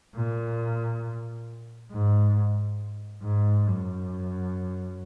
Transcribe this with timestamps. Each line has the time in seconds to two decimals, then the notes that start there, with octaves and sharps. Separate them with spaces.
0.16 A#2
1.92 G#2
3.23 G#2
3.67 F#2